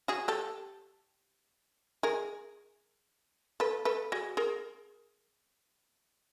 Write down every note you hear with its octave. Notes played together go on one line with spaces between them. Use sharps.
F#4 G#4
G4 A4
G#4 A#4
A4 B4
A4 B4
F#4 G#4
G#4 A#4